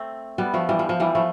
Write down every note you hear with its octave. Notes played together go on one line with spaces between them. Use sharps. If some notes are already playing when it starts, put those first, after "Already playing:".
Already playing: A3 C4
G3 B3
F3 A3
E3 G3
F3
F3
E3 G3
F3 A3